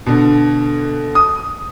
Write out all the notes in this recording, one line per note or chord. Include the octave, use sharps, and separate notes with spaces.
B2 D3
D#6